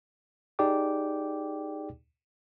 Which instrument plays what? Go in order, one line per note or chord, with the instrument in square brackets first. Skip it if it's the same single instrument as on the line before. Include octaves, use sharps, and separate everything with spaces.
[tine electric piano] D#4 G4 G#4 D5 G5 D6